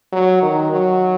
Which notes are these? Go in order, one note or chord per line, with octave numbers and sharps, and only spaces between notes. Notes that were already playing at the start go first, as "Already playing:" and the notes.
F#3
D#3
F#3